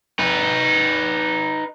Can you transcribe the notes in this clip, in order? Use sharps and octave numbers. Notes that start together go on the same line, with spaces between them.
D#4 B4